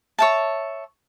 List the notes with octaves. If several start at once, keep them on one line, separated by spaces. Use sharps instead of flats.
C#5 E5 A5